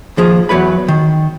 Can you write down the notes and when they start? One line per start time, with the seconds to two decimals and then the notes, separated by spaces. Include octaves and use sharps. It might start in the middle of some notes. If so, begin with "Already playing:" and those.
0.17 D#2 F3 G#4
0.49 E2 F#3 B4 B5
0.88 D#3